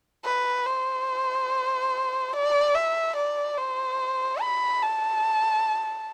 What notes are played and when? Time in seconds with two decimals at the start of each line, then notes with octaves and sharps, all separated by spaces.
0.25 B4
0.66 C5
2.33 D5
2.74 E5
3.16 D5
3.57 C5
4.41 B5
4.83 A5